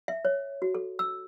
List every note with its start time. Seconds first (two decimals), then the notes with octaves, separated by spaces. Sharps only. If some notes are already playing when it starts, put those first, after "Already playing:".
0.08 E5
0.25 C#5
0.62 F#4
0.75 A4
0.99 E6